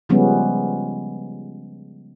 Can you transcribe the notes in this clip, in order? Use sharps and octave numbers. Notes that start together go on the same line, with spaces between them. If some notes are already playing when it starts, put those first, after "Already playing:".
C#3 F3 G3 G#3 B3 C#4